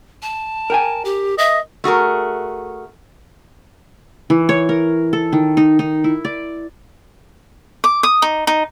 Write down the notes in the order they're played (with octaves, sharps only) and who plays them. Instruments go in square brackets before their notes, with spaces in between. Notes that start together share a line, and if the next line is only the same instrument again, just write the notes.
[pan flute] A5
[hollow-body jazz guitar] A#4 G5 G#5
[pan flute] G4
[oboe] D#5 [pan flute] E5
[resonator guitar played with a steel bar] A3 F#4 G#4 A#4
[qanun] E3
C#5
A#4
A4
D#3
D#4
D#4
E4
D5
[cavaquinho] D6
D#6
D#4
D#4